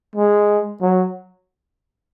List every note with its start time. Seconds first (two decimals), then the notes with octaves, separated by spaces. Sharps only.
0.16 G#3
0.82 F#3